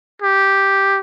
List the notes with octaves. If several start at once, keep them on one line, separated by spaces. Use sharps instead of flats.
G4